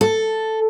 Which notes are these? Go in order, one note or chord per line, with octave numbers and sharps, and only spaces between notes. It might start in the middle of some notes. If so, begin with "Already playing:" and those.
A4